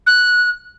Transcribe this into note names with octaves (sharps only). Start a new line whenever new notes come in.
F#6